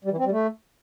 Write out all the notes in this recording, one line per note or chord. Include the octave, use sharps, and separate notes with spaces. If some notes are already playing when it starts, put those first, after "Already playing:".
G3
E3
C4
G3
A3